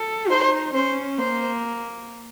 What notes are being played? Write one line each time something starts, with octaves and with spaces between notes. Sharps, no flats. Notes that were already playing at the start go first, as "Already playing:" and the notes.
Already playing: A4
D#4 C5
C#4 C5
A#3 C5